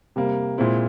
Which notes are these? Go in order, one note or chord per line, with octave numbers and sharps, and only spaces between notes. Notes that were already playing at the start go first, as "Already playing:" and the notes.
C3 G3 A#3
A#2 G#3 C4 E4